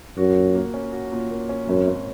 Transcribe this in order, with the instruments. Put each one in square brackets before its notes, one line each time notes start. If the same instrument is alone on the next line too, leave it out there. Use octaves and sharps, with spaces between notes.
[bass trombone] F#2 [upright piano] F#4
[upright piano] A#2
A#3
C#4
F#4
A#2
A#3
C#4
[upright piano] G#1 [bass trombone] F#2
[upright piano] G#1